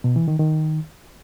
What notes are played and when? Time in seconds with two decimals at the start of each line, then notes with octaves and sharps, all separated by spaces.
0.04 B2
0.16 E3
0.28 D#3
0.39 D#3